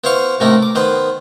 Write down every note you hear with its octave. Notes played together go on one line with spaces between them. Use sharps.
B3 E4 C5 F5 C#6
A2 C3 A3 A#3 D#4 E4
D6
D#3 B3 B4 C5